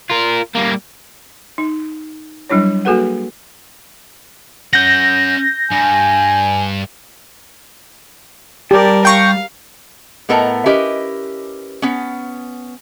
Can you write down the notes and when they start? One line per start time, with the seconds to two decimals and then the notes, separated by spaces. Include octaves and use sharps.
0.10 F4 A#4
0.55 G3 A#3
1.58 D#4
2.50 F#3 G3 D4 E4 C#5
2.85 A#3 F#4 G#4 A4 B4 F#5
4.73 C#4 F#5 G6 A#6
5.71 G2 G#5
8.71 G3 G4 A#4 D5 A5
9.05 F5 G5 C#6 A#6
10.29 A2 B3 A4 A#4 D#5 A#5
10.66 C#4 E4 G4 A#4 B4 D#5
11.82 B3 C#4